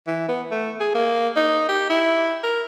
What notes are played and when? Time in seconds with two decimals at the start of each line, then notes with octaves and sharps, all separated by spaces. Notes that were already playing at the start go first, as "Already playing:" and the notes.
0.07 E3
0.29 B3
0.51 A3
0.80 G#4
0.95 A#3
1.36 D#4
1.68 G4
1.90 E4
2.43 A#4